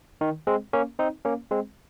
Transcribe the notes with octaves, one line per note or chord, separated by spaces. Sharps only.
D#3
G#3 C4
A#3 C#4
C4 D#4
A#3 C#4
G#3 C4